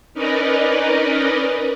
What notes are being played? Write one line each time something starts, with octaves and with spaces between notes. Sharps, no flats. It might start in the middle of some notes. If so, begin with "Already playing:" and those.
C#4 D#4 A#4 B4 D5 D#5